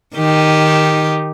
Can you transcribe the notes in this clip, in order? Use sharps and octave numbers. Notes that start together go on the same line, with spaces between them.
D#3 D#4 G4